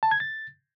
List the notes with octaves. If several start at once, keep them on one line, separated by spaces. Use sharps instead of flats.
A5
G#6
A6